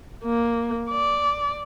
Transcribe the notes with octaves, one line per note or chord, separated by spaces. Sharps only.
A#3
D5